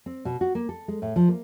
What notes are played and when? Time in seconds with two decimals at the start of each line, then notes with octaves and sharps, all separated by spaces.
0.06 C4
0.25 B2
0.41 F#4
0.55 A#3
0.69 A4
0.88 G#3
1.02 A2
1.16 F3
1.29 A#3